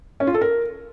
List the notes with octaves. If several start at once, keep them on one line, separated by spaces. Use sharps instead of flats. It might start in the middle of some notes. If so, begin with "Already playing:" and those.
C#4
F4
A4
A#4